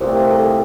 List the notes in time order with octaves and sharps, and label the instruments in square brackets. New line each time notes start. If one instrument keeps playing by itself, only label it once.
[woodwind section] C2 A#2 A3 C4 [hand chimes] C5
[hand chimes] A#4
A4
A#4